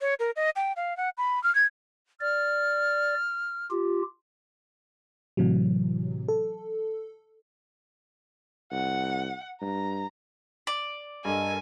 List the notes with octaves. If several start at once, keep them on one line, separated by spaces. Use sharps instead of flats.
C#5
A#4
D#5
G5
F5
F#5
B5
F6
G#6
D5 F6
F4 G4
A2 C3 E3 F#3
A4
C2 F#5
G2 A#5
D5
G2 A4 A#4 D#5 G#5